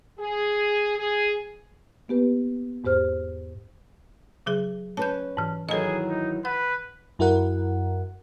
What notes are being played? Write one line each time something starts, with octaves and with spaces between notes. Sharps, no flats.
G#4
G#4
A#3 B3 G4 B4
E2 G#2 G4 C5 F6
C#3 F#3 G#4
C#4 B4 A5 G6
G#2 E3
D#3 E3 F#3 G#4 A4 D#5
D#4
B4 F#5
F#2 E4 F#4 A#4 F#5